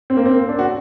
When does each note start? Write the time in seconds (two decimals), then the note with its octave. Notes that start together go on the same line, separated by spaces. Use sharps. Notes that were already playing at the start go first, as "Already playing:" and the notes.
0.10 C4
0.17 A#3
0.26 C4
0.39 A#3
0.49 D4
0.59 F#4